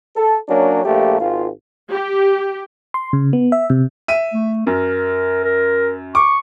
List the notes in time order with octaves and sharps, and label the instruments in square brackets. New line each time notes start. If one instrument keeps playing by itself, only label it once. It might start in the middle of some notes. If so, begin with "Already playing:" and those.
[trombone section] A4
F#3 A#3 C#4 D4
A#1 A3 A#3 G4
G#1 F4
[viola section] G4
[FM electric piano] C6
C#3
B3
E5
C3
[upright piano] E5 D#7
[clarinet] A3
[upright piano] F#2 [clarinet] A#4
[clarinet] A#4
[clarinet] C#6 [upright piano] D6